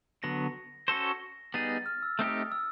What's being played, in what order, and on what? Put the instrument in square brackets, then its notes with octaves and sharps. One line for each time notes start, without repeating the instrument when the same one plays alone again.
[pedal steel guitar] D3 F#3 B3 [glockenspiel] A#6
[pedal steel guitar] C#4 F#4 A4 C5 [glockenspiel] A#6
[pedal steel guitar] G3 B3 D#4 G#4 [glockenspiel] A6
[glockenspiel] A6
F6
E6
[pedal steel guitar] A3 C4 D#4 G4 [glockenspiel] D#6
[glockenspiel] E6